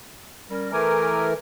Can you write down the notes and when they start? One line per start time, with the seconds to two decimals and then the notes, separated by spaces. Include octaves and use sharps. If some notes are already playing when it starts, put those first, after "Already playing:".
0.49 G3 C#4 A#4
0.72 E3 A3 A#4 G#5 D6